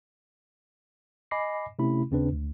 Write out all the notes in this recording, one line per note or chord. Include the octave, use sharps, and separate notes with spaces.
D#5 G#5 B5 D6 A#6 C7
C3 A3 C#4 E4 B5
D#2 C#3 C4 D4 B4
D2